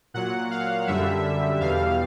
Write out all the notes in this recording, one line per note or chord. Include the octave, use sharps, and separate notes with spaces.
A#2 F#3 F#5
F5
F#2 D3 G3 E5
E2 B2 G3 F5